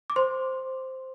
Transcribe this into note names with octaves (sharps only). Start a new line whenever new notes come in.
D6
C5 C6